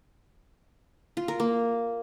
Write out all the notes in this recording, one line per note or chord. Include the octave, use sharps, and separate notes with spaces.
F4
A#4
A#3